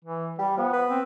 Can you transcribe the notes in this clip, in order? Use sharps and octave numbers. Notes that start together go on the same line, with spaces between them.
E3
G3 G4
F3 B3
B4
C4